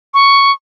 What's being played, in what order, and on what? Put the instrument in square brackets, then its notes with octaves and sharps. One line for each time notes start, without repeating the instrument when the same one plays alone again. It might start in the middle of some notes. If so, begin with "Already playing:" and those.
[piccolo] C#6